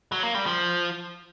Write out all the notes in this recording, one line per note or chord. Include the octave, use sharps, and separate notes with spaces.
F#3
A#3
G3
F3